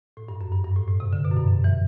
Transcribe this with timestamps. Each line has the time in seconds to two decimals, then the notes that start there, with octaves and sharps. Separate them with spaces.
0.17 A2
0.28 G2
0.41 F#2
0.52 G2
0.64 G2
0.76 A2
0.88 A2
1.00 C3
1.13 D3
1.25 B2
1.31 F#2
1.36 G2
1.48 F#2
1.64 E3